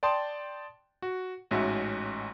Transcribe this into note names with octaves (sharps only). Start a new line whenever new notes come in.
D5 G5 A5 C6 D#6
F#4
A1 G#2 C#4 F#4 E5